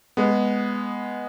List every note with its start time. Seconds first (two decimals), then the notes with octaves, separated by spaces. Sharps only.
0.17 G#3 B3